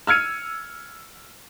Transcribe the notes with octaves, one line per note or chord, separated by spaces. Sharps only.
E6 F6 G#6 C#7 D#7